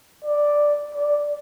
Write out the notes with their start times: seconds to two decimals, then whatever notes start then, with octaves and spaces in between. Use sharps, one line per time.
0.25 D5
0.95 D5